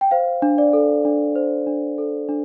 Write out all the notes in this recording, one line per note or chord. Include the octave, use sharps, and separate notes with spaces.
G5
C5 F5
D4
D5
A4
D4
C5
D4
A4
D4